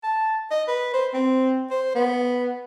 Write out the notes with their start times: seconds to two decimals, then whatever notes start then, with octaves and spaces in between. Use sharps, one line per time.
0.04 A5
0.51 D#5
0.68 B4
0.94 C5
1.14 C4
1.71 C5
1.95 B3